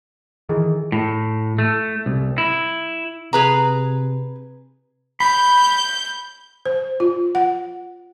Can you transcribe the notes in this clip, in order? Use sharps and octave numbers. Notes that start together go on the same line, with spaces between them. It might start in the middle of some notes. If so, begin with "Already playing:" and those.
D#3 E3 G#4
A2
A3
C2
E4
C3 G#4 B4 A#5
B5 G6
C5
F4
F#5